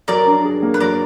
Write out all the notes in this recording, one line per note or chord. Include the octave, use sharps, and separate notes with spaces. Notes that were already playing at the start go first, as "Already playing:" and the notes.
F#3 A#4 D5
D4
G#4
A#3
B4
F#3 A#4 D5